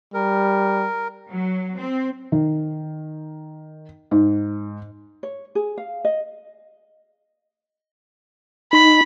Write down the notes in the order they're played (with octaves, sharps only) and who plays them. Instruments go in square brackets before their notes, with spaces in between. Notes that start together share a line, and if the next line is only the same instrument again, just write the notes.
[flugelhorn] G3 [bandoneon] A#4
[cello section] F#3
C4
[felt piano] D#3
G#2
[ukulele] C#5
G#4
F5
D#5
[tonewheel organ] D#4 [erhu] B5